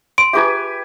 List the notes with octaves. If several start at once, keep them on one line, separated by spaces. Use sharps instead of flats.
C6 D7
F4 G4 G#4 B4 E5 G#5